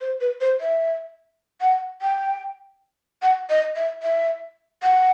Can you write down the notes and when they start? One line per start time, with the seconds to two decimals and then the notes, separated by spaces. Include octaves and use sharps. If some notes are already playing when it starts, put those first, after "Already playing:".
0.01 C5
0.21 B4
0.41 C5
0.61 E5
1.61 F#5
2.02 G5
3.22 F#5
3.49 D#5
3.75 E5
4.02 E5
4.83 F#5